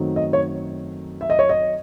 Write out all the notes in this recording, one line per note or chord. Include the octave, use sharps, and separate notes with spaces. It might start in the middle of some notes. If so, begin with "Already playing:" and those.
Already playing: F#2 D#3 F#3 A3 C4
D#5
C#5
E5
D#5
C#5
D#5